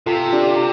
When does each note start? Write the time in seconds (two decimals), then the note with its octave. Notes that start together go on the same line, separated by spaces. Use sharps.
0.06 C3 F4 A4
0.33 D4 G4